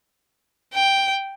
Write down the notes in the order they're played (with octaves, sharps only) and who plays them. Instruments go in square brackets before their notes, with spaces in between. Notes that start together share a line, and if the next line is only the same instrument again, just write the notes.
[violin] G5